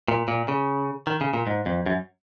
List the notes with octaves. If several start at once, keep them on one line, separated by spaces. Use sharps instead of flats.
A#2
A#2
C#3
D#3
C#3
A#2
G#2
F2
F#2